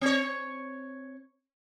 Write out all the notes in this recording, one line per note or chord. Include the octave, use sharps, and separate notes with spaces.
C4 C#5